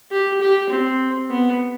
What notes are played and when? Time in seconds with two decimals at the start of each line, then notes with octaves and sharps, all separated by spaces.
0.12 G4
0.41 G4
0.70 C4
1.30 B3